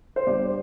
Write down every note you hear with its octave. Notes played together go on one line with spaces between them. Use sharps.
C5
G2 D5